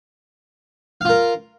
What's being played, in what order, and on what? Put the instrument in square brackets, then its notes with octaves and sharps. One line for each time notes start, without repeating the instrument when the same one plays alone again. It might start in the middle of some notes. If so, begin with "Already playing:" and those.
[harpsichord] F5
F4
A#4